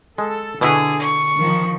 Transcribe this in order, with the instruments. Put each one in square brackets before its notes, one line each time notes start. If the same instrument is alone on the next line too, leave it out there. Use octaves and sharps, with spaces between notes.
[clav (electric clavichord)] G#3 [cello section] A4
[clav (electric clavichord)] B2 E4 F#4 [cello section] D3 [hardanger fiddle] G#4
[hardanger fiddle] C#6
[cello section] D#3 F3